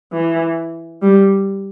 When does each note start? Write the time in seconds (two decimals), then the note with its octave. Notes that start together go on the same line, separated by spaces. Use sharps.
0.13 E3
1.02 G3